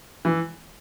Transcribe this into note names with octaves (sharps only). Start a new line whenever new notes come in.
E3